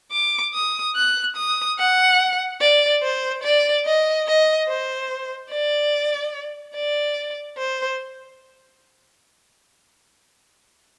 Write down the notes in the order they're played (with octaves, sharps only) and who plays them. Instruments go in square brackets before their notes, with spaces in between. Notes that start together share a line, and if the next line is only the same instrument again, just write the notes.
[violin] D6
D#6
F#6
D#6
F#5
D5
C5
D5
D#5
D#5
C5
D5
D5
C5